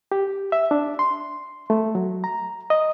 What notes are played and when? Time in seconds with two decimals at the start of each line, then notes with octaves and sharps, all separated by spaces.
0.12 G4
0.52 E5
0.71 D4
0.99 C6
1.70 A3
1.95 F#3
2.24 A#5
2.70 D#5